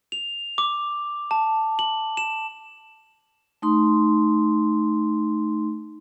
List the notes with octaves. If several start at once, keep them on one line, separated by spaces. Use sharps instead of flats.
F7
D6
A5
F#7
E7
A3 D#4 C6